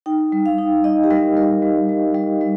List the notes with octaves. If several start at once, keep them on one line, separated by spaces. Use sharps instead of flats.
D#4 G5
G3
F5
D#4
D#4 D#5
G4
G3 A#4
G3 A#4
G3
G3
G3
G3